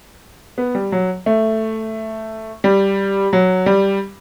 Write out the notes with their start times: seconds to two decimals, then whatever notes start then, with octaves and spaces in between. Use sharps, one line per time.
0.58 B3
0.75 G3
0.92 F#3
1.26 A3
2.64 G3
3.33 F#3
3.66 G3